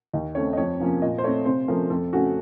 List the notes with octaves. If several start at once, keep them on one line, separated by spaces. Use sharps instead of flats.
D#2 D#5
C#3 A3 C4 C#5
D#5
F2 C#5
C3 F3 A#3 C#4
A#2 D#5
C5
A3 C4 C#5
C3 C5
F3 A3 C#4 A#4
F2 A4
C#3 A3 C#4 F#4